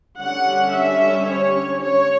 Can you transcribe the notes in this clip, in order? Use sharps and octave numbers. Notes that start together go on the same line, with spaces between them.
D3 G3 C#4 F#5
E5
C#5
C#5